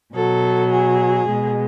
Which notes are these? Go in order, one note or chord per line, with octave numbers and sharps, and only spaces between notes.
B2 F#3 A4
G#4
B2 G#3